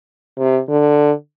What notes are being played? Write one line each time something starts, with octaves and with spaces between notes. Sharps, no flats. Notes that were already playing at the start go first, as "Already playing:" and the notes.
C3
D3